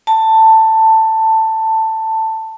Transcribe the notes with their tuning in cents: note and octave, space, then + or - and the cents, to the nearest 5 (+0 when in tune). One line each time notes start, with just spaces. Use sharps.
A5 +10